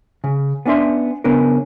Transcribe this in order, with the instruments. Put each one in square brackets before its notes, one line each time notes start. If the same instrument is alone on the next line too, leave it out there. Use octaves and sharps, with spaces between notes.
[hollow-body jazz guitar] C#3
B3 C#4 D4 E5 C6
C#3 B3 C#4 D4 A#4